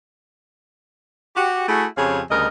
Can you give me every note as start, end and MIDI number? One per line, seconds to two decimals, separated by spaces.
1.36 1.64 66
1.36 1.64 67
1.67 1.86 57
1.67 1.86 64
1.67 1.86 66
1.67 1.86 68
1.97 2.20 41
1.97 2.20 49
1.97 2.20 67
1.97 2.20 68
1.97 2.20 73
1.97 2.20 77
2.30 2.46 38
2.30 2.46 49
2.30 2.46 55
2.30 2.46 70
2.30 2.46 75